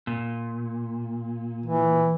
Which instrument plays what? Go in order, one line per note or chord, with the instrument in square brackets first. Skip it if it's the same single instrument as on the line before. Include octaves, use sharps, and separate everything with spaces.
[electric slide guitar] A#2
[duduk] E3